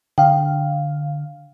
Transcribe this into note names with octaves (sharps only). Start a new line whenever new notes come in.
D3 F5 G5